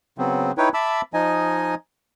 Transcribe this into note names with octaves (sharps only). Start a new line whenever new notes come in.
C#3 F#3 B3 C4
D#4 E4 B4 C#5 G5
E5 A5 B5 D6 E6
F3 D#4 D#5 G#5